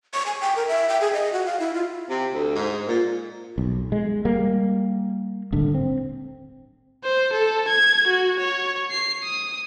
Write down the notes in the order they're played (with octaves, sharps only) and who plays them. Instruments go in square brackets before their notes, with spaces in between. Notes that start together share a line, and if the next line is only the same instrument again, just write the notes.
[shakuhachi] C#6
G#5
G5
A#4
E5
G5
G#4
D#5
F#4
F5
E4
F4
[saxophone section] C3
D2
G#2
A#2
[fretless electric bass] B1
G#3
G3 A#3
D#1 G#1 D3
C4
[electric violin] C5
A4
G#6
F#4
C#5
C7
D#6